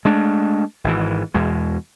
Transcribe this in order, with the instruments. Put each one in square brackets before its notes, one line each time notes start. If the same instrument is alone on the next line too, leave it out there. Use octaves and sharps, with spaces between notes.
[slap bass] G#3 A3 D4
G#1 G#2 E3
E2 B2 G#3